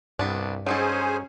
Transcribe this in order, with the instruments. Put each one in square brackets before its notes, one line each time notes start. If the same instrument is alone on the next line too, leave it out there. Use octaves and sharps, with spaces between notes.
[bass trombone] C2 [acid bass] G2 [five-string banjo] B3 D4
[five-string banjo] F#3 D#4 A4 [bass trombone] C#4 [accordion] G#4 C5 G#5